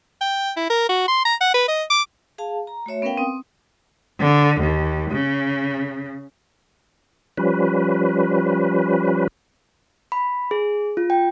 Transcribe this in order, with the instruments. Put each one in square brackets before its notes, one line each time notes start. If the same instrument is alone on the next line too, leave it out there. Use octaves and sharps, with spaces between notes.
[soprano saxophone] G5
E4
A#4
F#4
C6
A#5
F#5
B4
D#5
D6
[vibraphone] G#4 F5 A5
A#5
A3 F#4 C#5 E5
B3 C#4 A#4 B4 F5 G5
C4 D#6
[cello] D3
D#2
C#3
[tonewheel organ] F3 G3 C#4 B4
[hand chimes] B5
G#4
F4
G5